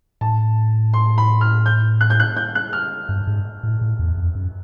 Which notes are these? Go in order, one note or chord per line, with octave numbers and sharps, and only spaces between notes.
A2 A5
C6
B5
F6
G6
F#6
G6
F#6
G6
F#6
F6
G2
G#2
A2
A2
E2
F2
F#2